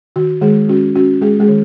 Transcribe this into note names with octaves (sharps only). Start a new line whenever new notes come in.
D#3 F#4
D#3 G#3 G#4
C#4 F#4
C#4 F#4
G#3 G#4
G#3 G#4
D#3